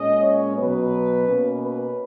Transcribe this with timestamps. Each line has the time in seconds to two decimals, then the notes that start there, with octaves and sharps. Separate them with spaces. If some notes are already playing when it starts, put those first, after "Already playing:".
Already playing: A#2 G#3 C#4 D#5
0.23 C#5
0.58 B2 F#3 B3 B4
1.27 B2 A#3 C#4
1.62 B4